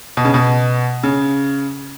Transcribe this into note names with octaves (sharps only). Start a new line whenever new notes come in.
B2
C#3
B2
C#3